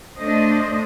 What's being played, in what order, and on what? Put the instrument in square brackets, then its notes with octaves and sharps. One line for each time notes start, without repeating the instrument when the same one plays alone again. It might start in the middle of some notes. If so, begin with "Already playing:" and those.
[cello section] A3 D4 C5 D#5